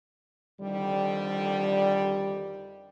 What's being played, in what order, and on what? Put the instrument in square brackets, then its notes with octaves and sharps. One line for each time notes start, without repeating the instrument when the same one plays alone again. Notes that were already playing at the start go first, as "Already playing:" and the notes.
[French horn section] F2 D3 D#3 G3